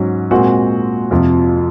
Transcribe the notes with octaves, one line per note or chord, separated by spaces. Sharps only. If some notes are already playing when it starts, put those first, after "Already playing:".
Already playing: G#2 F#3 C#4 F#4
A#2 G#3 C4 F#4
F2 C3 F3